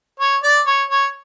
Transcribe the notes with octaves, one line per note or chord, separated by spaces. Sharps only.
C#5
D5
C#5
C#5